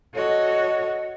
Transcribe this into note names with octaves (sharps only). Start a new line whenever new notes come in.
F#4 A4 C#5 D#5